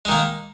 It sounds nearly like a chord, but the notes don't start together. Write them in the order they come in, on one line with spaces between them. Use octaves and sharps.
G#3 D#3 A#3